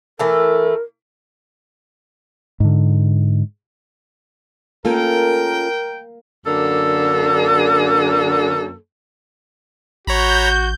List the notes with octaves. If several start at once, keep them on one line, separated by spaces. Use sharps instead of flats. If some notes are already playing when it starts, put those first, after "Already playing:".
E3 A3 A4 A#4
G#2 D3
A#3 C#4 F4 A4 A#4 G5
F#2 D3 A#3 D4 A4
A1 F#4 C#5 A#5 B5 G6